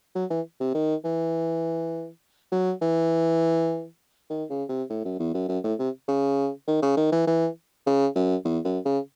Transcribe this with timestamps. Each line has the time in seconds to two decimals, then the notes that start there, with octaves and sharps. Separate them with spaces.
0.15 F#3
0.30 E3
0.60 C3
0.74 D#3
1.04 E3
2.52 F#3
2.81 E3
4.30 D#3
4.50 C#3
4.69 C3
4.90 A2
5.05 F#2
5.19 E2
5.34 F#2
5.48 F#2
5.64 A2
5.79 C3
6.08 C#3
6.67 D#3
6.82 C#3
6.97 D#3
7.12 E3
7.27 E3
7.86 C#3
8.15 F#2
8.45 E2
8.65 F#2
8.85 C#3